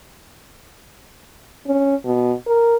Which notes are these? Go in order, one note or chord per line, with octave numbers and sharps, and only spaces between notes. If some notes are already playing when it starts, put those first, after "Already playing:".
C#4
B2
A#4